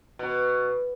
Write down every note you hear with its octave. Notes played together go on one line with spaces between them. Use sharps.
B2